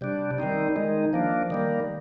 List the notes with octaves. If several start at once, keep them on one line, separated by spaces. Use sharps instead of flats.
C3 G3 D4
D#3 G3 C4 D#4
D#3 G#3 D#4
F3 A#3 D4
D#3 G3 A#3